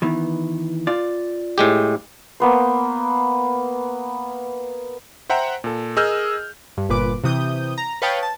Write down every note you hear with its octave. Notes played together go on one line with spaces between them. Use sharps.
D#3 E3 B3
F4 D5
A2 G#3 G4
A#3 B3 C5
C5 E5 F#5 G5 A#5
A#2 A4
G#4 A#4 D#5 E6 F6 G6
G2
G1 A#2 B4 D6
C3 E3 D#6 G6
A#5
B4 C#5 F5 G5 A5 D#6
A5